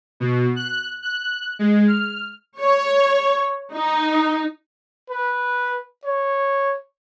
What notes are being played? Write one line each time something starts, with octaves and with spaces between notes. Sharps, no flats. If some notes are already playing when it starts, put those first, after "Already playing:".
B2
F#6
F#6
G#3
F6
C#5
D#4
B4
C#5